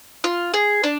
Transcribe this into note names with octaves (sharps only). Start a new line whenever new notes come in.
F4
G#4
D4